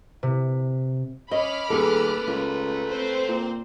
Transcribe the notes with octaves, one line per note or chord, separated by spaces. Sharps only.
C3
C#4 D#5 B5 D6 F6
D#1 A3 G#4 A4 B4
C#2 A#3
C4 C5
A#2